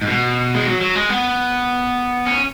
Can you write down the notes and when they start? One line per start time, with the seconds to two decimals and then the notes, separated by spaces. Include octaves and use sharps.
0.02 G#2
0.07 B2
0.55 G#3
0.67 F#3
0.81 F#3
0.95 G#3
1.10 B3
2.27 C#4